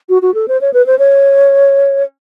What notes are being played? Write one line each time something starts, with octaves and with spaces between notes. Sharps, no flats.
F#4
F#4
A4
C5
C#5
B4
C5
C#5